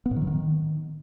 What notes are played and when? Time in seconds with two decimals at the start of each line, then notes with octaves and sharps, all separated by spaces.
0.06 B3
0.11 A2
0.16 D#3
0.22 F#3
0.27 D#3